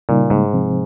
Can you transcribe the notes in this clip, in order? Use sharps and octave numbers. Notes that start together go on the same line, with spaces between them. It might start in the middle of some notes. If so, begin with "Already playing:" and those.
A#2 C#3 G3 A#3 D#4
G#2
C3 F3 C4